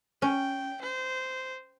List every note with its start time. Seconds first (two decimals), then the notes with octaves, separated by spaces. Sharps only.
0.22 C#4 G5
0.82 C5